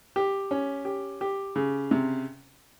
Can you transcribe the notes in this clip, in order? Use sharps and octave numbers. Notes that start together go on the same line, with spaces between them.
G4
C#4
G4
G4
C#3
C3